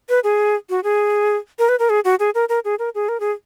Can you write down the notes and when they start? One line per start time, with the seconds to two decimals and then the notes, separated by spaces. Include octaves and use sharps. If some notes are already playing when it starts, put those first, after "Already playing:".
0.09 B4
0.24 G#4
0.70 F#4
0.84 G#4
1.59 A#4
1.69 B4
1.79 A#4
1.90 G#4
2.05 F#4
2.20 G#4
2.35 A#4
2.49 A#4
2.65 G#4
2.79 A#4
2.95 G#4
3.09 A#4
3.20 G#4